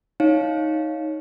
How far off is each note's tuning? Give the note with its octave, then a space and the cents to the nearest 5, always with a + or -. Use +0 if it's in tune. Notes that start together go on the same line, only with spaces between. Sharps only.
D#4 +10 C#5 +0 F5 +0